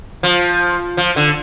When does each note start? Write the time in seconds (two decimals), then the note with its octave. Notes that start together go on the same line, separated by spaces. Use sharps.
0.23 F3
0.97 F3
1.16 D3